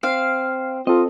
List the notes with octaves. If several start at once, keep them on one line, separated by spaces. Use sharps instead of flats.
C4 F5
C4 F4 A4 D#5